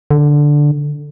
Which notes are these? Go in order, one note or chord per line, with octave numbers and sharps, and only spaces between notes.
D3